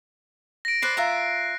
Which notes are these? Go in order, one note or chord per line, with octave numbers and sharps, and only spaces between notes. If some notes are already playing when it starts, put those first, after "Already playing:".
A#6 D7
B4 C5 D5 F#6 C7
F4 E5 A#5